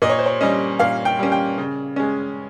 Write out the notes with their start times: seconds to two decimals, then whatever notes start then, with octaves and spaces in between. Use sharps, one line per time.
0.02 A#2 D#5
0.10 C#5
0.19 C5
0.26 C#5
0.41 G3 C#4 D#5
0.79 A#2 F5
1.05 G5
1.19 G3 C#4
1.32 G5
1.58 C#3
1.96 G#3 C#4